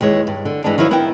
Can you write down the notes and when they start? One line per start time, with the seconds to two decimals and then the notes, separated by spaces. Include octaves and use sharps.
0.01 D#2 E3 G#3 C#5
0.27 G2
0.45 D3
0.64 G2 E3 G#3 B3 D4
0.78 D#3 F3 F#3 E4 F4
0.91 B3 E4 A#4 E5 G5